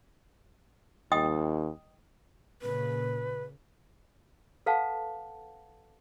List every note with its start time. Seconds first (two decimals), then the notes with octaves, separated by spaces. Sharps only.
1.12 D#2 D#5 G5 D#6
2.62 A#2 C#3 B4
4.66 A4 B4 F5 F#5 A5